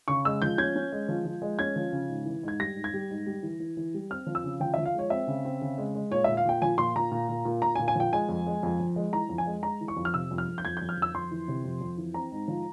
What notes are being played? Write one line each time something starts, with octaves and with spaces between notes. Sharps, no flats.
C#3 C#6
G#3 E6
F3 G6
C#4 G#6
C#4
G#3
F3
F3
G#3
C#4 G#6
F3
C#3
G#2
E3
G#2 G#6
G3 A#6
G#2
G#6
G3
G#2
G3
E3
E3
E3
G3
C4 F6
F3
E6
C#3
F3 G5
E5
F3
F5
G#3 C#5
C4 E5
C#3
C4
C#3
G#3
G#3
A#2 C#5
E5
A#2
F5
A#2 G5
F3 G#5
A#2 C6
A#2 A#5
A#2
A#2
A#2
A#2 A#5
G#5
A#2
G#5
F3 G5
G#3 G#5
F2
G#3
F2
F2
G#3
E3 A#5
F2
G#5
G#3
G#3 A#5
E3
C#6
F2
F6
C3 E6
F2
F6
F2
G6
F2 G#6
G6
F2
F6
F2
E6
F2 C6
E3
C3
F2
F2
E3
C4 A#5
G#2
F3